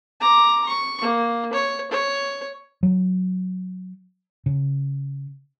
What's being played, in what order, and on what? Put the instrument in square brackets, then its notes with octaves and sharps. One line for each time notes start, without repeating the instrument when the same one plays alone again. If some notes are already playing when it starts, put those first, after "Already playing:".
[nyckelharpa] A#5 D6
C#6
A#3
C#5
C#5
[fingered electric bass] F#3
C#3